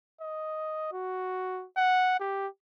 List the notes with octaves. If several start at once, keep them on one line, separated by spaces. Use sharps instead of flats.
D#5
F#4
F#5
G4